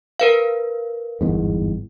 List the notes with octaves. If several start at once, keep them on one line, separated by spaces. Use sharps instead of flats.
A#4 B4 F5
G1 E2 G#2